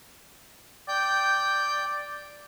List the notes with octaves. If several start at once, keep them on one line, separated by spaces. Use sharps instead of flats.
D5 G5 G6